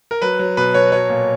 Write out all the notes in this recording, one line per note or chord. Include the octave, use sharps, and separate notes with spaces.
A#4
F#3 B4
F#3
B2 B4
B2 C#5
F#3 C#5
A#2